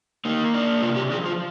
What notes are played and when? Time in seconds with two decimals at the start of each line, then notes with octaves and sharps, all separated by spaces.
0.25 A#3 D#4
0.54 D4
0.82 C3 F4
0.96 G4
1.11 F3 G#4
1.25 F4